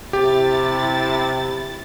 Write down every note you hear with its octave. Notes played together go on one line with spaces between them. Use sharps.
C3 E4 G4 A6